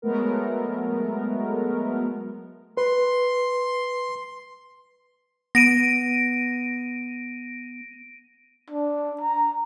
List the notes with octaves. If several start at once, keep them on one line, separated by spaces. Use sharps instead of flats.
F#3 G#3 A3 B3 A#4
B4 C6
B3 A#6 D7 D#7
D4
A#5